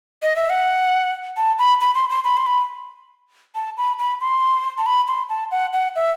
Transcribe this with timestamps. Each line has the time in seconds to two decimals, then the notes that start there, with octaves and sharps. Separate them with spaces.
0.22 D#5
0.36 E5
0.50 F#5
1.37 A5
1.59 B5
1.81 B5
1.95 C6
2.10 C6
2.24 B5
2.37 C6
2.46 B5
3.55 A5
3.78 B5
3.99 B5
4.21 C6
4.78 A5
4.86 B5
5.08 C6
5.29 A5
5.51 F#5
5.73 F#5
5.96 E5